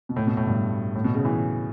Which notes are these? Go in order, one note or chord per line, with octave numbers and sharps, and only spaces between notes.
B2
A2
B2
A2
G2
A2
B2
C#3
E3